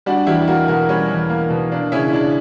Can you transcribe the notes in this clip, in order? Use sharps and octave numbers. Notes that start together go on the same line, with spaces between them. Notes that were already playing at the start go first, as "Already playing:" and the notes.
G3 D4 F#4
E2 E4 G4
A#3 F#4 A#4
B2 F#4 A#4
G3 C#4
E2
A#3
B2
A#3 D4
C#3 C#4 E4
C#3 D4